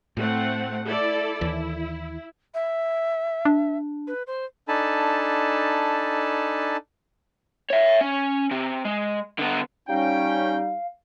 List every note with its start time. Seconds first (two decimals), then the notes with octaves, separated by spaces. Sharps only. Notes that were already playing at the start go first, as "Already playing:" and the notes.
0.17 A2 A3 C4 F#5
0.85 E4 A4 D5
1.41 D#2 E3 E4
2.54 E5
3.45 D4
4.07 B4
4.27 C5
4.68 D4 D#4 A4 G#5 A5 B5
7.70 C#5 E5
8.01 C#4
8.51 C3
8.85 G#3
9.39 D3 B3
9.89 G3 C#4 D#4 F5 G5